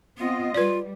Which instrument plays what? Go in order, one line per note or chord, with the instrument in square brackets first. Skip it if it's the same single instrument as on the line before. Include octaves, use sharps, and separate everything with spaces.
[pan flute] B3 [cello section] C4 F4 D#5
[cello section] G3 [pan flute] F4 [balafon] B4 D5